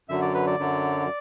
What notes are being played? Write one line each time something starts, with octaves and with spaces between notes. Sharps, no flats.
F#2 D3 F#3 E5
D5
B4
D5
F#2 D3 F#3